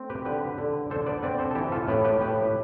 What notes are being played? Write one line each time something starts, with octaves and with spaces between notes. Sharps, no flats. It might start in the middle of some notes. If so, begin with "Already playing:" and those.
Already playing: A3 C4
G4 B4
D3 G4 B4
D3
D3 A4 C5
B4 D5
C4 B4 D5
A4 C5
A4
E3 E4 G4
F4 A4
A2 G4 B4
G4 B4
A2 G4 B4